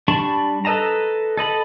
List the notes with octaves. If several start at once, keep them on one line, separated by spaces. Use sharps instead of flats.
G3 D4 A5 B5 C#6
A4 B4 D#5 A5 A#5
A4 D#5 B5